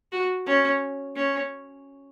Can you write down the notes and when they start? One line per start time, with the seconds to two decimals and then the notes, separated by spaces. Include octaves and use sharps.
0.12 F#4
0.46 C#4
1.16 C#4